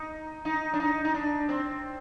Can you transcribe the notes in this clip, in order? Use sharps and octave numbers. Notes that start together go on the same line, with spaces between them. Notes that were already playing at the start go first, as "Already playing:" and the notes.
Already playing: D#4
D#4
D4
D#4
D#4
D4
C4